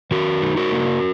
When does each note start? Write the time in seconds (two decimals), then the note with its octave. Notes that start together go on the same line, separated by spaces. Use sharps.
0.11 D#3 F#4 A#4
0.42 D#4
0.57 F#4 A#4
0.72 A#3